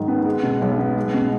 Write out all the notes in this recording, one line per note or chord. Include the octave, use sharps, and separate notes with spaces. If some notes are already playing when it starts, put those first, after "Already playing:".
Already playing: G#2 D#3 F#3
B3
G#3
B2
B1
B3
G#3
B2